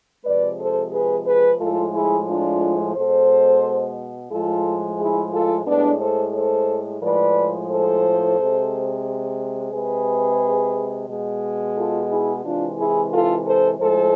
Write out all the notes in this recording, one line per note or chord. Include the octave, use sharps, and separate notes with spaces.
C3 F3 G#3 B4 D5
A4 C5
G#4 B4
G#4 B4
A2 F3 G#3 F4 A4
E4 G#4
D4 F4
B2 G#3 A4 C5
A2 F3 G#3 F4 A4
E4 G#4
F4 A4
A2 G#3 B3 D4
A4 C5
A4 C5
A2 F3 G#3 B4 D5
A4 C5
C3 G#3
C3 G#3 G#4 B4
B2 G#3
F4 A4
E4 G#4
C3 E3 G#3 D4 F4
E4 G#4
F4 A4
A4 C5
A2 F3 G#3 A4 C5